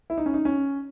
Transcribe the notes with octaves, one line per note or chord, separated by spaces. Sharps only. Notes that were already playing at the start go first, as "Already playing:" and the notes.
E4
D#4
C#4
D#4
C#4